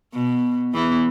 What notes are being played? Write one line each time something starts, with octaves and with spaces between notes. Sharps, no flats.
B2
E2 E3